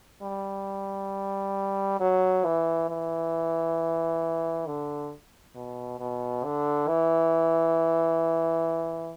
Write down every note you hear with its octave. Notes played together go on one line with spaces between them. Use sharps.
G3
F#3
E3
E3
D3
B2
B2
D3
E3